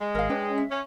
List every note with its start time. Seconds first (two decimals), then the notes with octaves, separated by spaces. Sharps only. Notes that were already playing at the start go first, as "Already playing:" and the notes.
0.01 G#3
0.15 G#1 A#4 F5
0.30 C#4 D4 B4 G5
0.58 E5
0.71 C#4